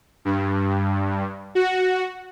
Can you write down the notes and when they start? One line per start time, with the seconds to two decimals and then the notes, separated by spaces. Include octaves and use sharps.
0.25 G2
1.55 F#4